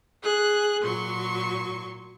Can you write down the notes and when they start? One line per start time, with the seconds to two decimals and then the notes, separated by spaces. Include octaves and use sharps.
0.22 G#4 F#6
0.83 A#2 F#3 C6 C#6